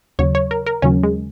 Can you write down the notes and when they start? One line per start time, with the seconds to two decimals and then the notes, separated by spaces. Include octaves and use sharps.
0.19 D#2 C#3 F#3 C#5
0.35 C#5
0.51 A#4
0.66 A#4
0.82 D#2 C#3 F#3 C#4
1.04 G#3